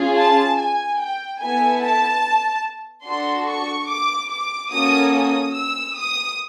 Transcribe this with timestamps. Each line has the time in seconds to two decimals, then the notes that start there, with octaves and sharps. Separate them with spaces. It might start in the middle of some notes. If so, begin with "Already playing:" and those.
Already playing: C#4 F4 G#4
0.16 A5
0.58 G#5
0.99 G5
1.40 B3 E4 A4 G#5
1.82 A5
3.05 D4 F#4 A4 C6
3.47 C#6
3.89 D6
4.30 D6
4.71 A#3 C#4 F#4 A4 D#6
5.12 D#6
5.54 E6
5.95 D#6